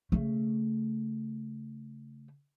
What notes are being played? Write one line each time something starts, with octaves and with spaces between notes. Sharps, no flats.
C#3 A3